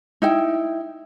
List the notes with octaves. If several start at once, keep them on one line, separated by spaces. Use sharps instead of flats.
D#4 E4 G5